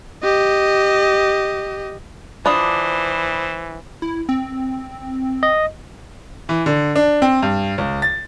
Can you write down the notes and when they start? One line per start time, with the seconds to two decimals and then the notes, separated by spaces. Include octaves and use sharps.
0.23 G4 D#5
2.46 E3 D4 F4 C5 D5 B5 D#6
4.02 E4
4.29 C4
5.43 D#5
6.49 E3
6.66 D3
6.96 D4
7.22 C4
7.42 G2
7.78 C#2
8.02 A6